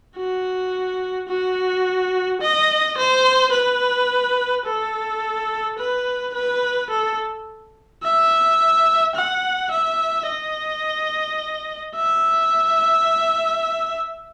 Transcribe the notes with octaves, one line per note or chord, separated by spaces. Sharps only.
F#4
F#4
D#5
C5
B4
A4
B4
B4
A4
E5
F#5
E5
D#5
E5